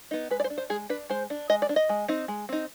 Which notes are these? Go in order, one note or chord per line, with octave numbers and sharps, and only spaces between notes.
B3 D#4
G#3 B4
D5
C5
D4
C5
G#3 G#4
D4 B4
G#3 C5
D4
G#3 D#5
D5
D4
D#5
G#3
C4 D#4
G#3
C4 D#4